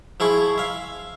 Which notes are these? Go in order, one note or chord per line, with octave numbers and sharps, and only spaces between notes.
F3 E4 G#4 C#6
E5 F5